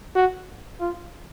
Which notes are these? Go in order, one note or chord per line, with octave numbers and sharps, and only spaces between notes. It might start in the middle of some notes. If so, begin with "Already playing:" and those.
F#4
F4